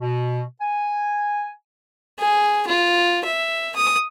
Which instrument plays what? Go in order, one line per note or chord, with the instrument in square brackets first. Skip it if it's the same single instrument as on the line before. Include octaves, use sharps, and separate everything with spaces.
[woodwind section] B2
G#5
[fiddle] G#4
F4
E5
D#6